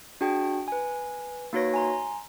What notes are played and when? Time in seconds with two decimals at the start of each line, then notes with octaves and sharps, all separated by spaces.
0.21 D4 F#4 G#4 G5 A5
0.68 B4 G#5
1.53 A#3 D#4 F#4 B4 C#5 A#6
1.74 G#5 A#5 C6